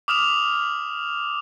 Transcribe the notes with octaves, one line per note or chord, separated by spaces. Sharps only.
D6 D#6 F6 E7 F7